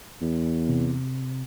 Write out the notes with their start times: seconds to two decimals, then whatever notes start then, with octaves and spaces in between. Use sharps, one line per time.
0.21 E2
0.69 C3